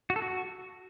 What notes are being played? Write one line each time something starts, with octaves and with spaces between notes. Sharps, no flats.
F#4
A4
F#4